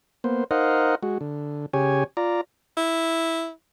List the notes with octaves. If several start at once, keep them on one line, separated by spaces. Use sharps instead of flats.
A#3 B3 C5
D#4 A#4 C5 D#5 F5 F#5
G#3 F#4
D3
C#3 G4 C#5 G#5
F4 D5 A#5
E4